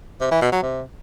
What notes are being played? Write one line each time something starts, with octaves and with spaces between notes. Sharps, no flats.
C3
E3
B2
F#3
C3